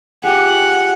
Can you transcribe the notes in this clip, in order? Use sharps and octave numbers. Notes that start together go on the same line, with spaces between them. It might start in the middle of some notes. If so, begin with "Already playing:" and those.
F4 G4 G#4 F#5